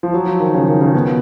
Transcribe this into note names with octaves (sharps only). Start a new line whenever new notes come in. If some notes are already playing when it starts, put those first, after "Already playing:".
F3
F#3
F3
D#3
C#3
D#3
C#3
B2